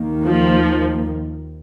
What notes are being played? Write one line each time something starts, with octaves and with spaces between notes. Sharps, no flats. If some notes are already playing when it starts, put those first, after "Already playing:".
Already playing: D#2 D#3 A#3
F3